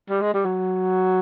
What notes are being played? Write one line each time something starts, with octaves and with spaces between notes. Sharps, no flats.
G3
G#3
G3
F#3